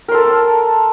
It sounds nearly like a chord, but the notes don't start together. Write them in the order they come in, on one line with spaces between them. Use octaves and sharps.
A#4 C6 A4 A5